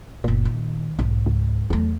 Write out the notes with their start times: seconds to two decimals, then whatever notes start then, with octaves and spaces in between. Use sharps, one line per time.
0.24 F#1 A#2 B3
0.45 D#3
0.99 B1 G#2
1.26 C#2
1.70 E2 F#3 A3